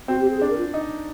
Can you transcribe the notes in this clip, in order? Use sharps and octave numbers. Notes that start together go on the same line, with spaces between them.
C4 F#4
G4
G#4
D4 G#4
A#4
F4
D#4